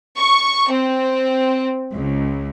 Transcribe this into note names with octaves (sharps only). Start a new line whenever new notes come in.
C#6
C4
C#2